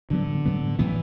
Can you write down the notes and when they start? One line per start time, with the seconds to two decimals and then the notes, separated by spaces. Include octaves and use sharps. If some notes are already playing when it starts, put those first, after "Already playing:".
0.10 A2 D3 F#3 B3
0.45 A2 F#3 B3
0.79 A2 E3 F#3 B3